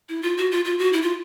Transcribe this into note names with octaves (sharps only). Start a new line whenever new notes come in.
E4
F4
F#4
F4
F4
F#4
E4
F4